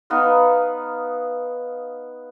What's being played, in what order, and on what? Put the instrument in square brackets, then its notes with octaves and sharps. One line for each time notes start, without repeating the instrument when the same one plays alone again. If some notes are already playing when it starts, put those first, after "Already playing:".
[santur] B3 D#4 B4 F5